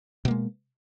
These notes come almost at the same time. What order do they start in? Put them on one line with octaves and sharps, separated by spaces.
B2 A#3 G#3